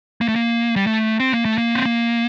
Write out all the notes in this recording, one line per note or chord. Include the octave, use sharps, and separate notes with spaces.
A#3
A3
A#3
G3
A3
C4
A#3
A3
A#3
C4
A#3